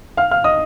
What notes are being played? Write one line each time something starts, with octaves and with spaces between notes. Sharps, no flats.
F5 F6
F5 F6
D#5 D#6